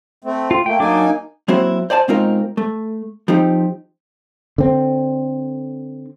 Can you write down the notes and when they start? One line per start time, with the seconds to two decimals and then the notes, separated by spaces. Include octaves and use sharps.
0.24 A3 C4
0.51 F4
0.66 A3 A#3 G5
0.80 F#3 A#3 D4 D#4 G#5 D6
1.48 F#3 A#3 C4 E4 F#4 C5
1.90 C5 D5 G#5 A5
2.08 B2 G#3 C4 D#4 F4 A#4
2.57 A3
3.28 F3 C4 D#4 G4
4.58 D3 C4